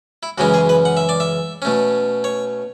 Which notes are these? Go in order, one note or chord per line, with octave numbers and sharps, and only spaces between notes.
E4
F#2 C#3 E3 G#3 C#4 F#4
G#4
B4
F#5
E5
D5
E5
B2 A3 C#4
C#5